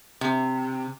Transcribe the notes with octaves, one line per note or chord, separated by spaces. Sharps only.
C3